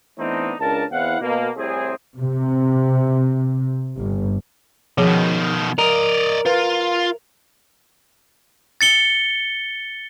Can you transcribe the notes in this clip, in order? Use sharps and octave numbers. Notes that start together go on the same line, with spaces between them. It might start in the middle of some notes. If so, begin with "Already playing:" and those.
E3 A3 B3 C4 D4 D#4
C#2 C#3 D4 A#4 A5
E2 C4 E4 F5 F#5
B2 A#3
C2 A2 C3 C4 G#4
C3
G1
B2 D#3 F3 G#4
A#4 D5 D#5
F4 B4
A6 C#7 G7